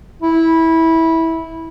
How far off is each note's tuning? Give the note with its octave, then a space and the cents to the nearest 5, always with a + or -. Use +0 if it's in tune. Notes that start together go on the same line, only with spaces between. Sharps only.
E4 -15